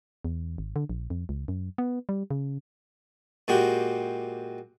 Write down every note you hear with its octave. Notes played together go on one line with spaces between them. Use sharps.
E2
G#1
D3
A#1
F2
C#2
F#2
B3
G3
C#3
A#2 G#3 F#4 G4